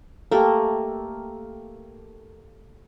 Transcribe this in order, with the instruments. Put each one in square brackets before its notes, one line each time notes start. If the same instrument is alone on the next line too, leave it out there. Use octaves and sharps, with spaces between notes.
[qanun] A3 A#3 [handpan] G4 A4